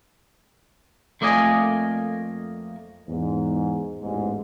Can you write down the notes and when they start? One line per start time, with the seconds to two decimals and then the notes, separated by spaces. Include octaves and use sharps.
1.21 F2 A3 A#3 D5 D#5 G#5
3.08 E2 G#2
4.01 A1 E2 G#2